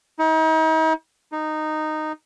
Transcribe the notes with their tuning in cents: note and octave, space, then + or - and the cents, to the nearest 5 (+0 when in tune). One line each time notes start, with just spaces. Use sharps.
D#4 +40
D#4 -10